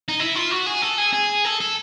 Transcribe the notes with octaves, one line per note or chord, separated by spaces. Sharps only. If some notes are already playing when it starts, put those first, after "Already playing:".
D#4
E4
F4
F#4
G#4
A4
G#4
G#4
A4
A4